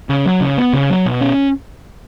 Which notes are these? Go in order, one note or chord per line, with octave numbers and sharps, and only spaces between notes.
C#3
F#3
C#3
B3
C#3
F#3
B2
C#4